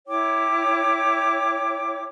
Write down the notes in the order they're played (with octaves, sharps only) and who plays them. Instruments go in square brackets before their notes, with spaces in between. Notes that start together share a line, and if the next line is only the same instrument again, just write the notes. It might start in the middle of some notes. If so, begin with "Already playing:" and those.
[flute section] E4 C#5 G5 D6